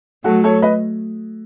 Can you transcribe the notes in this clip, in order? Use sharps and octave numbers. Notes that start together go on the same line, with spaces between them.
F#3 A3 F#4 A4
A4 C#5
B4 D#5